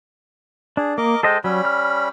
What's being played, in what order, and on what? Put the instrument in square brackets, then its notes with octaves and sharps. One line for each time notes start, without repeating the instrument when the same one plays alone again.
[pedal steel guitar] D4 [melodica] G#4
[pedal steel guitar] A#3 [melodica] A#4 D#5 D6
[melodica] G#3 G5 [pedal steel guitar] A4 C5 D#5
[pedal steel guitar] F#3 [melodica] G3 C#4 B5
[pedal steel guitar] F6